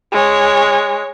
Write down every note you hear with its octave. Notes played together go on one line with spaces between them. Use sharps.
G#3 C#5